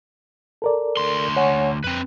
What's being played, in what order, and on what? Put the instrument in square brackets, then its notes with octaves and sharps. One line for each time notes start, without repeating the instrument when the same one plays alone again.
[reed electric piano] A4 A#4 D5
[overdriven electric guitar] D2 C6
[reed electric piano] C#5 F#5 G#5
[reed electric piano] F2 [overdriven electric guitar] C4 B4